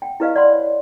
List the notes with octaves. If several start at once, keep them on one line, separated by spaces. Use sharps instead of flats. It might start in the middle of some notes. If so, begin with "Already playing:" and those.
F#5 G5
E4 G4 B4 D#5 F5
D5 F#5 B5 C6
C#5